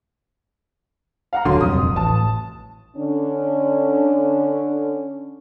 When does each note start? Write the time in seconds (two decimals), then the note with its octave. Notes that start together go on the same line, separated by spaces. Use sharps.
1.33 F5 F#5 A#5
1.45 D#1 D3 F#3 C6
1.61 D#1 C2 F2 D#6
1.96 A1 A5
2.97 D3 C#4 D4